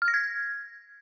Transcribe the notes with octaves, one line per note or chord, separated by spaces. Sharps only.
F6
A#6
G#6